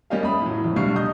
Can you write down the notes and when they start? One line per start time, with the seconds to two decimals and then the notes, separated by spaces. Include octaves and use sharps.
0.10 G3 A#3 C#4 G4 D#5 F5
0.23 E5 B5 D#6
0.42 A2 F#3
0.64 F2
0.76 B1 D3 G3 F5 C#6 C7
0.96 D#5 D#6 G6